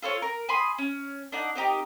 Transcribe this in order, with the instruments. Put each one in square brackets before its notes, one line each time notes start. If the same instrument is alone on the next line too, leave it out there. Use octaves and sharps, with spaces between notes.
[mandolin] F4 A4 C5 C#5
A#4
G#5 B5 C6 D#6
C#4
D4 D#4 F#5
C4 D#4 G4 A#4